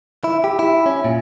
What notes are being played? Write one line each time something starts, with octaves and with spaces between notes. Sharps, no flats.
E4
G4
E4
C#4
A#2